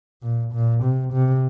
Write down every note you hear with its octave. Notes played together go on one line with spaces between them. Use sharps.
A#2
A#2
C3
C3